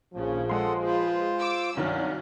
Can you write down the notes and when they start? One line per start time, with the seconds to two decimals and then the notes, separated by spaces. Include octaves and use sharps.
0.14 A#1 D#2 C#3 F3 C#4
0.49 G#3 A4 F#5 C6
0.84 F4 G#4 B4 C5
1.39 D6 E6
1.77 C2 G2 D#3 F#3 C#4